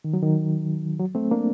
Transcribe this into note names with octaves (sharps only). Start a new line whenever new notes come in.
D#3
F#3
D#3
F#3
A3 C4
A#3 D4